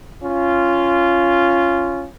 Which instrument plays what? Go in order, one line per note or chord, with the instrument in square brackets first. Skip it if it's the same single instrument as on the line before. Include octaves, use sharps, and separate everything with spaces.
[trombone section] C#4 F4